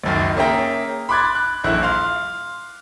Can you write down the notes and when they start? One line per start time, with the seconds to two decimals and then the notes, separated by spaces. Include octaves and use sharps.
0.04 C#2 F#2 D#3
0.37 A#3 C#4 G#4 E5 G5 A#5
1.09 B5 C6 D6 F#6 G#6 A6
1.35 F#6
1.63 D#1 A#1 E4 F#6
1.83 F5 C6 F6